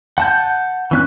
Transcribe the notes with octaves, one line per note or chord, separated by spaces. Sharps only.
F#5 A5 G6
E3 C#4 F#6